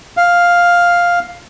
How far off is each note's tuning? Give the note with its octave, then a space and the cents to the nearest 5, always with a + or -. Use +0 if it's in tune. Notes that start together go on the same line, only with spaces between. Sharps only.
F5 +5